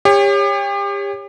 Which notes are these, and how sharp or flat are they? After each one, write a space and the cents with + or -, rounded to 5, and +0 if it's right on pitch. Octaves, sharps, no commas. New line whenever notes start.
G4 +35 C#5 +0